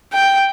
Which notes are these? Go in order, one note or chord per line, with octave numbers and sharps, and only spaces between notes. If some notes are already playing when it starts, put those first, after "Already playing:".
G5